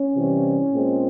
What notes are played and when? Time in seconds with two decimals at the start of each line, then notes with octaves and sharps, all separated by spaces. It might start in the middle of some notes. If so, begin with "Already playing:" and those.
Already playing: C#4
0.15 C3 E3 G3 C4
0.72 A#2 G#3 C4